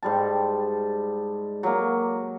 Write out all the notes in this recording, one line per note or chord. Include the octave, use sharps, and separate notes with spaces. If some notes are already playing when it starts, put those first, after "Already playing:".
G#2 G3 A5
F#3 A#3